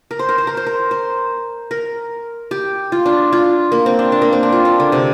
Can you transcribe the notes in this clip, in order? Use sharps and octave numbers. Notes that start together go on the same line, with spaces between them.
A#4
C5
A#4
C5
A#4
C5
A#4
C5
A#4
G4
F4
D4
F4
A#3
C4
D4
D4
A#3
C4
D4
F4
D4
D3
C3